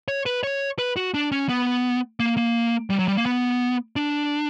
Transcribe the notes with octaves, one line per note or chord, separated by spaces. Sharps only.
C#5
B4
C#5
B4
F#4
D4
C#4
B3
A#3
A#3
G3
F#3
G3
A#3
B3
D4